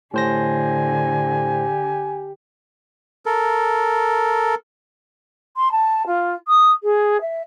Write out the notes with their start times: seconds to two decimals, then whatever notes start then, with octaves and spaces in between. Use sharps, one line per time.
0.14 A2 D3 G4 C5 G#5 A#6
3.26 A4 A#4
5.57 C6
5.72 A5
6.06 F4
6.48 D#6
6.83 G#4
7.21 E5